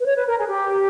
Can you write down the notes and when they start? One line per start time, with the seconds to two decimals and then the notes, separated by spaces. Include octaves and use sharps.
0.01 B4
0.06 C#5
0.17 B4
0.27 A#4
0.38 G#4
0.48 G4